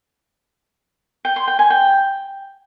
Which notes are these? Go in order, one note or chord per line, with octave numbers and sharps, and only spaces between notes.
G5
C6
G5
G#5
G5